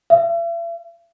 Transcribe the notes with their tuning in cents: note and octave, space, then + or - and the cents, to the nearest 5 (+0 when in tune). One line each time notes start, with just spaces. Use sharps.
E5 +45